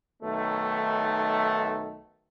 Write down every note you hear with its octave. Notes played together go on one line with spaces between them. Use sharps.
B1 D#3 A3